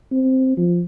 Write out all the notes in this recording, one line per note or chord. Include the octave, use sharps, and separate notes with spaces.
C4
F3